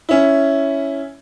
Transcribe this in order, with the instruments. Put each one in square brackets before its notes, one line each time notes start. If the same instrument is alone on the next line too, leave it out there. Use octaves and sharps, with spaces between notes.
[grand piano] C#4 E4